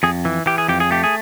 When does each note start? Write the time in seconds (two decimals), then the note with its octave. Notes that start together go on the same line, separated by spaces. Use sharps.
0.03 F2 G#4
0.25 E3
0.46 E3 G4
0.58 G#4
0.68 F2 G4
0.80 G#4
0.91 A3 G4
1.04 G#4